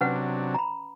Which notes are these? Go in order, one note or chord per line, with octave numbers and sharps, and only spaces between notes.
C3 F#3 C#4 D4 B4 F#5
A#5 B5